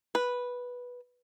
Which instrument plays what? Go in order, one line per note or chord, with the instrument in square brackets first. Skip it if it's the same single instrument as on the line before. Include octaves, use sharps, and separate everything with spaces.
[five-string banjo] B4